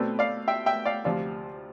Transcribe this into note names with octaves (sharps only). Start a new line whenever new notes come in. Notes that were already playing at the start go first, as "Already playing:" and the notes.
Already playing: B2 A3 C4 B4 D5
D5 F5
E5 G5
E5 G5
D5 F5
D2 C3 F3 D5 F5